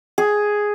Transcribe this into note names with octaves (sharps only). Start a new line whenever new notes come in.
G#4